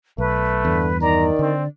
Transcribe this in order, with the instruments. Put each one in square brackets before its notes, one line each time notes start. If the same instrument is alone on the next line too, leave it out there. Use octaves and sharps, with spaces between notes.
[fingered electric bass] B1 [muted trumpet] A3 [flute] B4
[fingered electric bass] E2 G2 [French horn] D3
[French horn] D#3 [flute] D5 [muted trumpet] A#5
[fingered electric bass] D3 [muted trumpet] C4